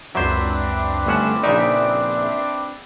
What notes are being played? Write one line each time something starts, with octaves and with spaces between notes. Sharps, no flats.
C#2 F#2 F#3 C4 D4 B4 C5 E5
G1 A3 C#4 F#5 E7
A#1 C#3 D#4 D5 E5